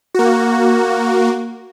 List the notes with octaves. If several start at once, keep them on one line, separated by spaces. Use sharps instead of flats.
A#3 F#4